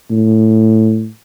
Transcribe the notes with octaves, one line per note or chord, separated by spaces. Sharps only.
A2